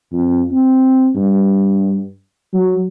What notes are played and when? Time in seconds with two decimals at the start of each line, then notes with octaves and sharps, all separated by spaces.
0.13 F2
0.51 C4
1.15 G2
2.53 F#3